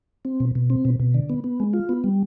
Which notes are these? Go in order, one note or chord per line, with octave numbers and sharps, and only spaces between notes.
C4
B2
B2
C4
B2
B2
D3
B3
B3
G#3
F4
B3
G3